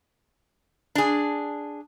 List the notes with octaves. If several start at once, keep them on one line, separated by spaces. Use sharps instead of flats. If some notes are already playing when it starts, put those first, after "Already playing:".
D4 G#4